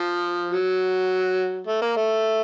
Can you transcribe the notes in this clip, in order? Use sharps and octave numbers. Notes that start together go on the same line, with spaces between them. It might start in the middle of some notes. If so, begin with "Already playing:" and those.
Already playing: F3
F#3
A3
A#3
A3